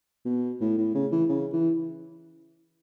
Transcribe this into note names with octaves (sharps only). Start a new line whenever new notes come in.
B2
A2
A2
C#3
E3
C#3
E3